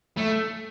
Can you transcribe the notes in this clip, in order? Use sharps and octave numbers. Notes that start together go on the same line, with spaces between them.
A3